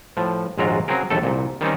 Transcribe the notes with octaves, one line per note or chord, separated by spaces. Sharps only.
A2 F3
A#1 D#2 G#2 F#3 F4 A#5
C#3 F#3 C4 G#4 A#4
A#1 D#2 A3 A4
C2 A#2
D#3 G3 C4 C#4 D#4